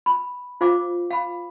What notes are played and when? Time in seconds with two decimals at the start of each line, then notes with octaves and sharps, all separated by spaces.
0.06 B5
0.61 F4 C5 F5 D6
1.11 F5 B5